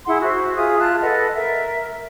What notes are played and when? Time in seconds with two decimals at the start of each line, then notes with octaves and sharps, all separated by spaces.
0.06 E4 G#4 F#5 C6
0.22 F#4 C5 E5
0.56 F4 G#4 E5 D#6
0.79 F4 A5 F#6
1.02 A4 B4 D#5 F#5
1.34 A#4 E5